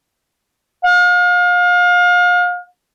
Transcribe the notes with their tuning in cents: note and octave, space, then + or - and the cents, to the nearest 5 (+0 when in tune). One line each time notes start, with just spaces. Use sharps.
F5 +35